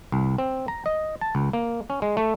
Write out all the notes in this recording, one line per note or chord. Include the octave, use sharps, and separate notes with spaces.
C2
C4
A#5
D#5
A5
C#2
A#3
C#4
G#3
A3